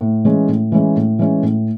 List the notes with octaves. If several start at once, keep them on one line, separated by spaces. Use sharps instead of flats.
A2
E3 G#3 C#4
A2
E3 G#3 C#4
A2
E3 G#3 C#4
A2